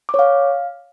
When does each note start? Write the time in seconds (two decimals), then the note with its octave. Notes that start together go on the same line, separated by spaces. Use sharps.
0.09 D6
0.14 C#5
0.19 F5